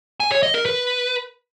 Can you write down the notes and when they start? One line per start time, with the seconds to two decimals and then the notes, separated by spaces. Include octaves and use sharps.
0.20 G#5
0.31 C#5
0.43 D#5
0.54 A#4
0.65 B4